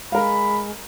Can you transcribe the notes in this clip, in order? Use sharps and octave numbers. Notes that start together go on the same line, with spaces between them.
G#3 A#4 F5 B5